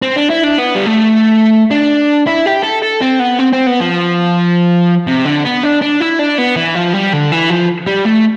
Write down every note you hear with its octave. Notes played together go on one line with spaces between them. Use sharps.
C4
D4
E4
D4
B3
G3
A3
D4
E4
G4
A4
A4
C4
B3
C4
C4
B3
F3
C3
D3
B3
D4
D4
E4
D4
B3
E3
F3
G3
D3
E3
F3
G3
A3